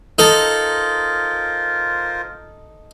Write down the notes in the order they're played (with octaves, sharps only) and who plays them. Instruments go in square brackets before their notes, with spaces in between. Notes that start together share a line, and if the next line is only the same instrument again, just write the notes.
[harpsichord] D#4 A4 [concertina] F4 A#4 C5